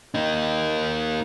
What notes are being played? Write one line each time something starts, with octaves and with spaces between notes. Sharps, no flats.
A#3 D#4